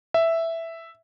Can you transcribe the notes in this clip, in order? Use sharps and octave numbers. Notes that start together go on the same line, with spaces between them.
E5